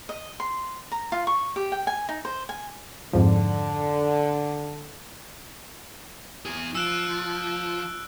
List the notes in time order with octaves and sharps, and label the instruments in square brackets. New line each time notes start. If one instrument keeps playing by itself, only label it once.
[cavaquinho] D#5
C6
A#5
F4
C#6
G4
G5
G#5
D#4
C5
G#5
[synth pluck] F2 G#2 F3 [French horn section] D3
[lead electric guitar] E2 G#4
[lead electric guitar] F3 [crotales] E6 F#6 D7
[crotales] F#6